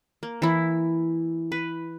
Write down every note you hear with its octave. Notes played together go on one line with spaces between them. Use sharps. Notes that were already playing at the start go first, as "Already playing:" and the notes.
A#3
E3 E4
B4